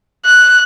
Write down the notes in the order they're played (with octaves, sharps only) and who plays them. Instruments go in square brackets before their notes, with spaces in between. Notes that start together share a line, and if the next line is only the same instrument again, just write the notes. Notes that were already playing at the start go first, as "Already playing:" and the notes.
[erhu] F#6